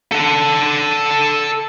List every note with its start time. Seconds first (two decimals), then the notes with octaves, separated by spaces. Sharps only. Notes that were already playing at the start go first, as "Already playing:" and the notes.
0.12 A4 F#5